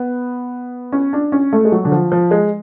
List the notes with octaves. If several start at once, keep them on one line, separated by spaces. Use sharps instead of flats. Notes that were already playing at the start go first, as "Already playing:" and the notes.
Already playing: B3
C#4
D4
C#4
A3
G#3
F#3
D3
F3
F3
G#3